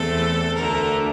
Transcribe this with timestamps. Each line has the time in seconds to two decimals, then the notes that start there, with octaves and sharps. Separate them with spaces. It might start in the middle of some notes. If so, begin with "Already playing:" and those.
Already playing: E2 E3 A3 C4 A4
0.55 D2 D3 A3 A#4